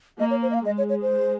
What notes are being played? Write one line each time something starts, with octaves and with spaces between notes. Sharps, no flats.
A#3 D#5
C#5
C5
D#5
F5
G#3 D#5
C#5
C#5
C5